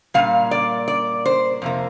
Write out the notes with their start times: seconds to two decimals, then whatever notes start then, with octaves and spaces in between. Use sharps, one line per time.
0.14 A#2 G3 F5
0.51 D5
0.88 D5
1.26 C5
1.62 F2 C3 A#3